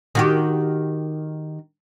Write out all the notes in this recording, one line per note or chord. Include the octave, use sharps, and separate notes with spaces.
D#3 F#4 G4